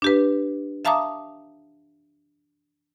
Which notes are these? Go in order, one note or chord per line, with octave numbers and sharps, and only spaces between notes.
D4 G4 B4
E5 F5 A5 A#5 D6 D#6